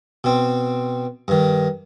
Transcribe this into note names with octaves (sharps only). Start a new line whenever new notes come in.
B2 C4
G2 D#3